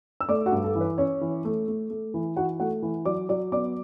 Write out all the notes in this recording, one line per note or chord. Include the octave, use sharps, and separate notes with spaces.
E6
A3 D5 D6
F#4 F#5
G2
A4
E3
B4
C#4 C#5
E3
A3
A3
A3
E3
E3 F#4 F#5
A3 F#4 F#5
E3
F#3 D5 D6
F#3 D5 D6
B3 D5 D6